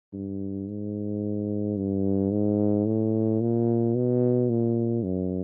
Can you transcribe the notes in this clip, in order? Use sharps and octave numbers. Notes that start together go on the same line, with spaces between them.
G2
G#2
G2
G#2
A2
A#2
B2
A#2
F#2